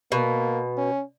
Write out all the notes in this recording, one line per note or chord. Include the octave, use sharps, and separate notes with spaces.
B2 A#3
C#4